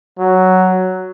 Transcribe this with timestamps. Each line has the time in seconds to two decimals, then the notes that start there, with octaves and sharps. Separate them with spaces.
0.19 F#3